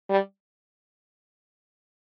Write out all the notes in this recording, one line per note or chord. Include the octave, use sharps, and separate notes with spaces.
G3